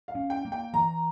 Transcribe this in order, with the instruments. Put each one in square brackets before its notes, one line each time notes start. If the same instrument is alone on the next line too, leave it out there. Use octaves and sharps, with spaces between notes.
[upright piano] F5
[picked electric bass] C#4
[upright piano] G5
[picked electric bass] A#3
[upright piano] G5
[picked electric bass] E3 [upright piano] A#5